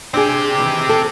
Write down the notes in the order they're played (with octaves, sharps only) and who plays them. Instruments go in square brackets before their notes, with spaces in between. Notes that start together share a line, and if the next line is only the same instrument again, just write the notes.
[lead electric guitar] C4 G4 [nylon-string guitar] D4 G#4
[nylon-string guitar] D#3 E3
A4